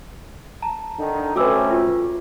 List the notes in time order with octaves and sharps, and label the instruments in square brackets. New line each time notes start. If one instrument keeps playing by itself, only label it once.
[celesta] A5 A#5
[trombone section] D3 D#3 D#4
[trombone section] A3 C4 C#4 [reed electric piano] F#4 B4 [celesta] A4 D6 E6
[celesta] F4